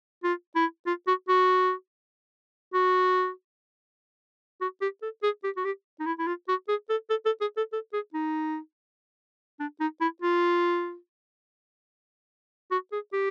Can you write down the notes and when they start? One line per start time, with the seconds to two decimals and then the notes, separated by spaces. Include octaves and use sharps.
0.23 F4
0.55 E4
0.86 F4
1.07 F#4
1.28 F#4
2.74 F#4
4.61 F#4
4.81 G4
5.02 A4
5.23 G#4
5.44 G4
5.57 F#4
5.65 G4
5.99 D#4
6.06 E4
6.19 E4
6.27 F4
6.48 F#4
6.68 G#4
6.89 A4
7.10 A4
7.26 A4
7.41 G#4
7.57 A4
7.73 A4
7.93 G#4
8.14 D#4
9.60 D4
9.80 D#4
10.01 E4
10.22 F4
12.71 F#4
12.92 G#4
13.13 G4